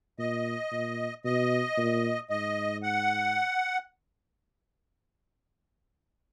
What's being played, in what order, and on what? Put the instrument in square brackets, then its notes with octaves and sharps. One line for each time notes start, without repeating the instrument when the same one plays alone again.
[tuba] A#2 [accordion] D#5
[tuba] A#2
[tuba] B2 [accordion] D#5
[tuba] A#2
[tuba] G#2 [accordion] D#5
[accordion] F#5